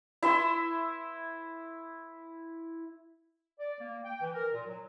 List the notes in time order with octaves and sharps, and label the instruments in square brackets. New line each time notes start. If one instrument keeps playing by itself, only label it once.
[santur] E4 E5 C6 E6
[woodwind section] D5
A#3
G5
E3
A#4
A#2
F#3